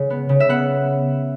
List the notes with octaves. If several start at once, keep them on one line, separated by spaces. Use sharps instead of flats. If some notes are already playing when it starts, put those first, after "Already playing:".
Already playing: C#3 G#3
B3
C#3
E5
B3 F#5